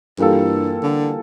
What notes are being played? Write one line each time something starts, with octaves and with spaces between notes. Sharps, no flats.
G2 E3 G3 A#3 F4 A4
D3